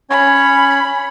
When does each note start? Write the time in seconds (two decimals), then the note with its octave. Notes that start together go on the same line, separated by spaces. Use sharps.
0.10 C#4 C#5 B5